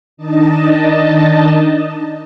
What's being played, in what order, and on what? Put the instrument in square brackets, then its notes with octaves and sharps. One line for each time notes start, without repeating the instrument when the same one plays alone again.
[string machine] D#3 D4 D#4 D#5 A5